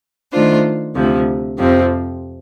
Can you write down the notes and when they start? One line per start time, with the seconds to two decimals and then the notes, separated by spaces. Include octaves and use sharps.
0.32 D#3 A3 D4 F4 C5
0.96 D2 C3 F3
1.58 F2 C3 F3 C4